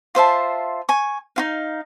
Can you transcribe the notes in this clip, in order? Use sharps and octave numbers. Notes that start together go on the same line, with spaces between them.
F4 C5 E5 A5
G#5 C#6
D#4 F4 F5